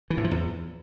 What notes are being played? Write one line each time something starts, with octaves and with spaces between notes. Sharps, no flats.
E3
A2
F3
E2